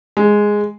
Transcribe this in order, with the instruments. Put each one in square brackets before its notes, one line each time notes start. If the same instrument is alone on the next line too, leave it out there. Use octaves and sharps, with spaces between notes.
[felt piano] G#3